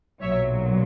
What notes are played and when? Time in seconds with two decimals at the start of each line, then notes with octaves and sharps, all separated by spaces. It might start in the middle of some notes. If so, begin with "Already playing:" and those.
0.21 B1 A#2 F#3 C#5 E5